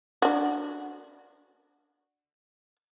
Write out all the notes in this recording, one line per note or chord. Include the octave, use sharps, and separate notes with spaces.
D4 F#4